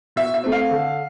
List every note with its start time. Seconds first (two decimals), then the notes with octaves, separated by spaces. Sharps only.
0.16 B2 E5
0.34 E5
0.44 A3 C4
0.52 F5
0.71 D3